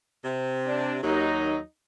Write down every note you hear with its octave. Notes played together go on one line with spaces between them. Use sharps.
C3
D4
D#2 F#3 D#4